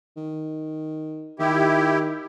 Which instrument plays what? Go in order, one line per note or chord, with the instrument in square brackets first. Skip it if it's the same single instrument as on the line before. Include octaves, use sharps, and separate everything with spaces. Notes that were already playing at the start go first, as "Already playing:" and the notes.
[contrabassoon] D#3
[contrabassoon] D#3 [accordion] E4 G4